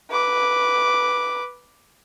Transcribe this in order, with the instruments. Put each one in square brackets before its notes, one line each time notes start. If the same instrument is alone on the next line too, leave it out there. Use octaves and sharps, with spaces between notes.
[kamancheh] B4 D6